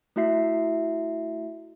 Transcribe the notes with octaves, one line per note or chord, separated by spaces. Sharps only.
A3 E4 F#4 E5 C7